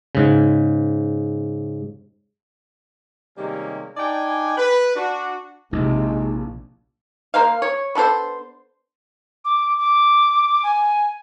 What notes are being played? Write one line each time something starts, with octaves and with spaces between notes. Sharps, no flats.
G#2 C#3
C3 D#3 G3 G#3 A#3 C#4
D4 D#4 D5 G5 G#5
B4
D4 F#4
A#1 C3 G#3 D#4 E4
A#3 C5 F5
C#5
B3 D4 A4 C5
D6
D6
G#5